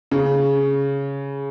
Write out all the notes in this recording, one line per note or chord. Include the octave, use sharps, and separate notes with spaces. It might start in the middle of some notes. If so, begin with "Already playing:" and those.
C#3